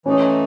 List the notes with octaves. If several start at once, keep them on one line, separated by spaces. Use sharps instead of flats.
E3 A3 C#4 D#4